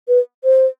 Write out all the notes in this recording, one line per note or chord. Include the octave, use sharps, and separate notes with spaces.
B4
C5